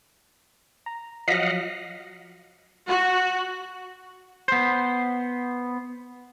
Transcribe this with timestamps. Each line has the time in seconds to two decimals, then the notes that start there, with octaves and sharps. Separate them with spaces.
0.86 A#5
1.28 F3 F#3 D#5 F5 F#5 A#6 B6
2.89 F#4
4.48 B3 C5